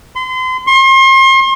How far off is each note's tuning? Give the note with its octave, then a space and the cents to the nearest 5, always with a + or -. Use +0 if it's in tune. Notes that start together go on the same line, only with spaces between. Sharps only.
C6 -35
C6 +40